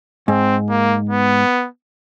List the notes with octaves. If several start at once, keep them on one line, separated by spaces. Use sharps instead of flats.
G#2 C4
A#3
B3